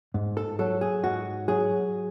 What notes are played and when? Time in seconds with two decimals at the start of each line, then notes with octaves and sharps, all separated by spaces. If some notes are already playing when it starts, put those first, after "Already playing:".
0.14 G#2
0.37 A4
0.59 F#3 A4
0.81 G#4
1.04 G#2 F#4
1.48 F#3 G#4